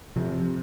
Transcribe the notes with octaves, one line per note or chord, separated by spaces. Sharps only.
C3 F3